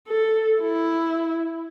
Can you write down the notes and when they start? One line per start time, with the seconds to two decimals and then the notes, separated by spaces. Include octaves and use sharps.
0.08 A4
0.60 E4